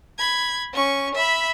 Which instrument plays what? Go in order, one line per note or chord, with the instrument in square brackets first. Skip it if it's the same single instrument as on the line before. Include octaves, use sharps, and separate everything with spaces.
[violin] B5 G#6
C#4 C#6
E5 B5